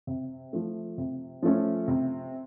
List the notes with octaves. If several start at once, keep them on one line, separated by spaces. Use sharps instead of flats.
C3
F3 A3
C3
F3 A3 C#4
C3